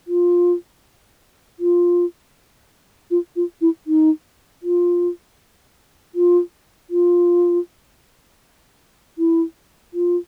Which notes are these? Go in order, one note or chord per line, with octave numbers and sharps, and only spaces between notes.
F4
F4
F4
F4
E4
D#4
F4
F4
F4
E4
F4